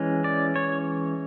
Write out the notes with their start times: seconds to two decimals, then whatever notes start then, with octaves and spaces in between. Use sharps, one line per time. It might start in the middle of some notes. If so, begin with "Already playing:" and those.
Already playing: E3 G#3 C#4
0.24 D5
0.56 C#5